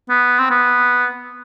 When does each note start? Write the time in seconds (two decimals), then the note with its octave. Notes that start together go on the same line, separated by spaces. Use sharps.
0.09 B3
0.39 C4
0.51 B3